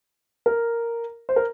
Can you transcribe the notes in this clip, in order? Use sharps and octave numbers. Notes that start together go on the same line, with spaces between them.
A#4
C5
A#4